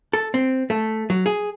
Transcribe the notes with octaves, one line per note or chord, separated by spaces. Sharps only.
A4
C4
A3
F#3
G#4